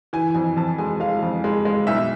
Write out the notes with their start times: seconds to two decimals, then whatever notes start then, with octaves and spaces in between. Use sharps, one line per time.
0.13 E3 G#5
0.34 F2 G#5
0.57 F2 A5
0.78 G#3 G#5
1.00 G#3 F5
1.22 F2
1.44 G#3
1.65 G#3
1.87 B1 E5